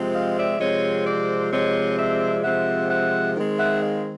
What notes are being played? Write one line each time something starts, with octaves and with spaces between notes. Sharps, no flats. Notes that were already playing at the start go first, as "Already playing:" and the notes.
Already playing: C3 F3 G#3 C4
D#5 F5
D5 E5
C3 F3 G#3 C4 C#5 D#5
C5 D5
C3 F3 G#3 C4 C#5 D#5
D5 E5
C3 F3 G#3 C4 E5 F#5
E5 F#5
D#3 G#3 C4
E5 F#5
D#5 F5